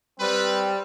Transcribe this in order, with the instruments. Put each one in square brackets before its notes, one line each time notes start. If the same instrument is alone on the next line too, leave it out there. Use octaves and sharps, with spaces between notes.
[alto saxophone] G3 [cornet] C4 [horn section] B4